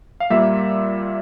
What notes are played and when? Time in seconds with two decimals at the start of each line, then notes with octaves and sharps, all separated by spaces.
0.20 F5
0.30 A#2 G3 A#3 E5